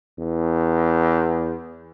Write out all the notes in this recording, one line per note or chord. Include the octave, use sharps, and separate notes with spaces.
E2